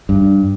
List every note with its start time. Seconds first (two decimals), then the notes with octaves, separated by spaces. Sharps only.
0.09 G2